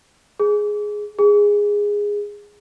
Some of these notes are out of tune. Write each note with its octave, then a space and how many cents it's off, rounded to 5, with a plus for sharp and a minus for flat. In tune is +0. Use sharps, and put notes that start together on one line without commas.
G#4 +5
G#4 -10